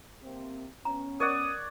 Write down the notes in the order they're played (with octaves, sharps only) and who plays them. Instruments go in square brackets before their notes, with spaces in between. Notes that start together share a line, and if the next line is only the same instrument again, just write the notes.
[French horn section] C3 A#3 C4
[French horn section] B3 C#4 [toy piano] A#5
[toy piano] A#4 [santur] C#5 D5 F#5 [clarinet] D#6